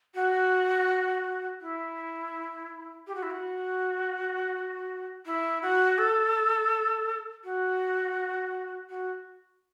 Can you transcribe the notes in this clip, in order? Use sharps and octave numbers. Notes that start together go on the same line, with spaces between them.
F#4
E4
G4
F#4
E4
F#4
E4
F#4
A4
F#4
F#4